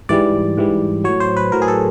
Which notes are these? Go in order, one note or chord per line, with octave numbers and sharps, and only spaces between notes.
G#2 E3 G3 D5
G#2 E3 G3
A2 F#3 C#5
C5
B4
A2 F#3 A#4
G#4
A4